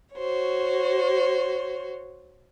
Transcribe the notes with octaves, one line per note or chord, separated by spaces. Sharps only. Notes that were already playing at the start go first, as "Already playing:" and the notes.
F#4 C5 C#5